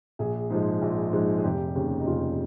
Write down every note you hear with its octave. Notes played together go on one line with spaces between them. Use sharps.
A#1 G#4
G#2 F3 G#3
A#1
G#2 F3 G#3
G#4
F1 G4
D#2 C#3
D#4
F1 F4